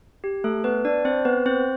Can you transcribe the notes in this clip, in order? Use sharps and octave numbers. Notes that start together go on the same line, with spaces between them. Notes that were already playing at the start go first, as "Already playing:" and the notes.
G4
A3 A4
B3 B4
D4 D5
C4 C5
B3 B4
C4 C5